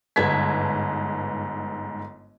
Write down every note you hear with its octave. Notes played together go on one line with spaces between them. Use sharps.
G1 G#2 B4 A5 G#6 B6